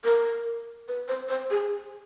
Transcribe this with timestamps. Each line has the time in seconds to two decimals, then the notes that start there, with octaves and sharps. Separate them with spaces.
0.05 A#4
0.88 B4
1.08 C5
1.29 C5
1.51 G#4